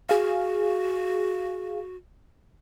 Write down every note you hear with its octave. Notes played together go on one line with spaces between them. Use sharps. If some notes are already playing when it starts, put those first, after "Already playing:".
F#4 G#4 F5